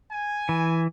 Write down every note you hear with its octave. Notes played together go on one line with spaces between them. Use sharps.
G#5
E3